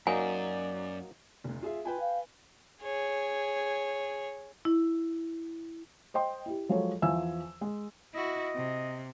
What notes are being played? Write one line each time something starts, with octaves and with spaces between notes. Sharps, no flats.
F#2 F#3 A#3 D#4 D5 G#5
F1 D2
F4 G#4 E5
F4 B4 G5 G#5
F5
G#4 C#5
E4
C5 D#5 G5 C6
E4 G4
F3 F#3 G#3 A4 C#5
E2 F3 C5 E5 G#5 E6
G#3
E4 F#4 D#5
C3